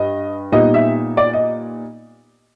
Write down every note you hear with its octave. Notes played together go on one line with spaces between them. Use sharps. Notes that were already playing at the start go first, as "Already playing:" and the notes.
Already playing: G2 D#5
A#2 G3 B3 D#4 D#5
E5
D5
D#5